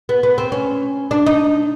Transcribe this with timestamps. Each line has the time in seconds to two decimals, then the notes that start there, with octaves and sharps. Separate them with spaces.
0.09 B3
0.23 B3
0.38 C4
0.52 C#4
1.11 D4
1.26 D#4